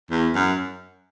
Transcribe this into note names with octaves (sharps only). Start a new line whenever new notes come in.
E2
F#2